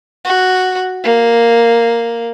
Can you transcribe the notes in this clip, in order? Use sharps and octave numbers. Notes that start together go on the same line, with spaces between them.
F#4
A#3